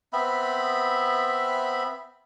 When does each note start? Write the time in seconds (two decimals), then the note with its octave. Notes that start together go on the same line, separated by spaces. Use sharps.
0.13 B3 C4 E5 B5